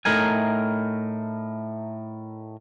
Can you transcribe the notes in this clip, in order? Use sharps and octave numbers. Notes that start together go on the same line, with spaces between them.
A2 A3 D#4 A#4 G#5